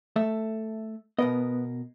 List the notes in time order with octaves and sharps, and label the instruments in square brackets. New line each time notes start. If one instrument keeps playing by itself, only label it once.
[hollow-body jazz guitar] A3 A4 E5
[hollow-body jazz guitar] B2 A#4 D#5 [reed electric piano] B3